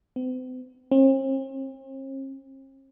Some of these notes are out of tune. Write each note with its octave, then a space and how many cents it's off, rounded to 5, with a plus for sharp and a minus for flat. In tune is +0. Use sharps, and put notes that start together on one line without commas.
C4 -45
C4 +45